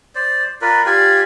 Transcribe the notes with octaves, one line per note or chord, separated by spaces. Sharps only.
C5 D5
F4 A#4 B4 D5
F4 G4 D5 G#5